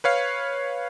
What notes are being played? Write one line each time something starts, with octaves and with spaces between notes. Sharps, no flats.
B4 C#5 F5